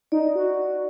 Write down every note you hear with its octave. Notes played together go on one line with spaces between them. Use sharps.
D#4 D5
F#4